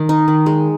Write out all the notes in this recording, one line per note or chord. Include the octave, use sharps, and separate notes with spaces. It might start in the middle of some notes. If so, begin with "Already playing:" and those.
Already playing: D#3
D#4
D#3
G#3